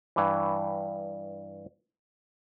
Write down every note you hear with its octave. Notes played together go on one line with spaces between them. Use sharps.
G2 E3